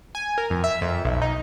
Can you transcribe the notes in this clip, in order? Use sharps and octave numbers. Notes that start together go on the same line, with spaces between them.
G#5
A#4
F2
E5
F2
B1
D#4